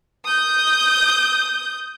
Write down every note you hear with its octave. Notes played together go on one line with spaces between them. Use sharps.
D#6 G6